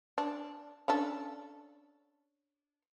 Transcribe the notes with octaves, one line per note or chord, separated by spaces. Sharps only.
D4
C#4 D4 A4